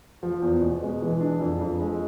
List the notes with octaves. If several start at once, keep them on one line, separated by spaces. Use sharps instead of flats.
F3
E2
B2
G#3
E3
D4
F2
F2
G#3